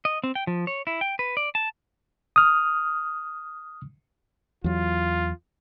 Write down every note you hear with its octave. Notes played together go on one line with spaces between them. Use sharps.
D#5
C4
G5
F3
C#5
E4
G5
B4
D5
A5
D#6 F6
E2 F#3 F4